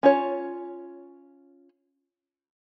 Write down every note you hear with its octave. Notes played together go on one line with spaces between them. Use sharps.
C#4 F4 C#5